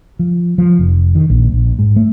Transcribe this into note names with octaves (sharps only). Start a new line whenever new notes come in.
F3
F3
F1
D#3
A#1
A#1
G#2
A3